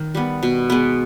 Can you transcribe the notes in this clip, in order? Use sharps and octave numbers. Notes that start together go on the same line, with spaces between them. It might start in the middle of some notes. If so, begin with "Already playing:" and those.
Already playing: D#3
G3 B3
B2
G#3 B3